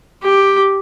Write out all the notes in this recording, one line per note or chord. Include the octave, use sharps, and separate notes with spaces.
G4